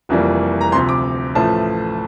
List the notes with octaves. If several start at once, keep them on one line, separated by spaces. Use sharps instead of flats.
F1 F2 E3 G3 A#3
A#5
D2 C3 F3 C6
D6
A1 A2 F3 A3 A5